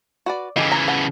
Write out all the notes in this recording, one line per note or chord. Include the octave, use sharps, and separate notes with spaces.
F#4 B4 D5
C#3 E3 D#4 G4 A4
A#5
F#5 A5